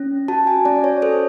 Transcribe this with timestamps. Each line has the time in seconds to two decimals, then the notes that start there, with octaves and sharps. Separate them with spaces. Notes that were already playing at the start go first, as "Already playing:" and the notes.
Already playing: C#4
0.28 F#4 A5
0.47 G#5
0.65 C#4 D5
0.84 C#5
1.02 A4 C5